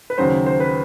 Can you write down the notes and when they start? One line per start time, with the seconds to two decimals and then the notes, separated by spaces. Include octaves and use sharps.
0.10 B4
0.18 D#2 C#3 F#3 C5
0.46 C5
0.60 B4